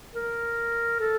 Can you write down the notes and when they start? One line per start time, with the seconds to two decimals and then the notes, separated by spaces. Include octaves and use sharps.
0.15 A#4
1.00 A4